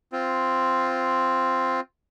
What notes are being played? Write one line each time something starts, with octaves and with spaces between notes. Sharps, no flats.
C4 F4